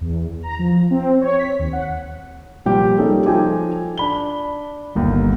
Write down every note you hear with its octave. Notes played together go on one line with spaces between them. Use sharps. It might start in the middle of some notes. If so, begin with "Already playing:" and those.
E2
A#5
F3
C4
C#5
B6
D#2
F#5
A#2 F3 G3 G4
G3 A#3 C#4 D#4 G#4 A4
F3 D#4 A4 G5 G#5 D6
D4 B5 G7
G1 D#2